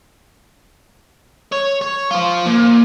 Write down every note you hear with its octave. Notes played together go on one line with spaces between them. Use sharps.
C#5
C#5
F4 C5
A#2